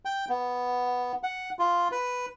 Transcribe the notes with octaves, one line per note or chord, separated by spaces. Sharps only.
G5
B3
F#5
F4
B4